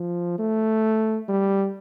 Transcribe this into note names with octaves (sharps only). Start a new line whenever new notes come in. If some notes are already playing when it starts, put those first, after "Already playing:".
Already playing: F3
A3
G3